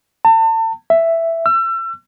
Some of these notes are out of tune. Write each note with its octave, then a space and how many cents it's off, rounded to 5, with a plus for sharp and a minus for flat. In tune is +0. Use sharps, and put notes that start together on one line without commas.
A5 +35
E5 +5
E6 +35